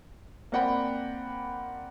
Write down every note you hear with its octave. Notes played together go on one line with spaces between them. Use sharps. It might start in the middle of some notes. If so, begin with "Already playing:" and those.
A#3 C4 D5 F#5 G5 B5